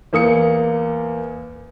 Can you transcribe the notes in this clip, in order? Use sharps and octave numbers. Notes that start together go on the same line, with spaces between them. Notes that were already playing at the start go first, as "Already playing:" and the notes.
E2 A#3 D#6 C#7